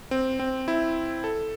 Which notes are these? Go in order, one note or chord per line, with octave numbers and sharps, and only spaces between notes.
C4
C4
E4
A4